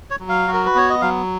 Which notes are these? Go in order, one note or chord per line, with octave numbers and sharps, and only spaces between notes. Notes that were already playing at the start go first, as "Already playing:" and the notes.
C#5
F#3
F5
F#4
A#4
B4
B3 C#5
D#5
F#3 F5